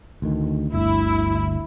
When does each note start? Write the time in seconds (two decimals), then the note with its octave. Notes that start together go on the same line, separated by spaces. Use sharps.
0.22 D2 D#3
0.74 G1 D2 E4